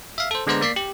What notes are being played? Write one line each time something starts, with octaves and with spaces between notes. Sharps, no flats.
E5 F5
A4 C5
D3 G#3 B3 C5 D5 A#5
A#3 D5 B6 C7
G4